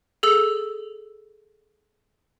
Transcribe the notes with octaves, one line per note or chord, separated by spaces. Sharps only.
G#4 A4 E6